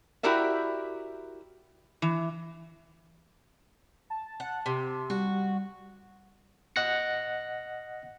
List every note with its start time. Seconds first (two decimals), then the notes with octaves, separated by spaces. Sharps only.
0.23 E4 F#4 G4 A#4 D5 E5
2.02 E3
4.10 A5
4.40 F#5
4.66 C3
5.10 G3 F#4
6.76 D#5 F#5 F#6 A#6 C#7